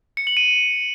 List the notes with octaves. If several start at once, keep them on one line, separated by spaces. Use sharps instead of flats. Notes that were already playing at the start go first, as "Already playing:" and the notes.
C#7
F#7
D#7